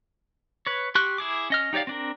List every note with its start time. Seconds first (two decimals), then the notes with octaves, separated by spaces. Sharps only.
0.67 B4 C#5
0.95 G4 C6 C#6 F#6
1.18 E4 G#4 D6
1.50 C#4 D#5 F6
1.73 D#4 G4 C#5 D5 F5
1.87 C4 D4 A#4